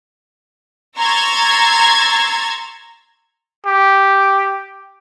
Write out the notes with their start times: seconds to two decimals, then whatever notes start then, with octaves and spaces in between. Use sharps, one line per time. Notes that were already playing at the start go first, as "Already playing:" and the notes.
0.98 A#5 C6 C#6 E6 G#6 A6
3.66 G4